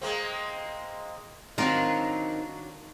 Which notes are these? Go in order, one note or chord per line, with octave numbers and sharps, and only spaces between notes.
G#3 A#3 C4
D#3 F#3 C4 D4 F4 A#4